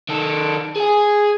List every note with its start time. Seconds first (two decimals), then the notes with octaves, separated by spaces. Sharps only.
0.09 D#3 A4
0.76 G#4 G#5